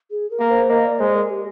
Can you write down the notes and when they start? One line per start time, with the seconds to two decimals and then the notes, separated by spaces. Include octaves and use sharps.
0.11 G#4
0.31 A#4
0.40 A#3
0.50 C5
0.69 A#3 D#5
0.85 D5
0.99 G#3 C5
1.15 A#4
1.30 G4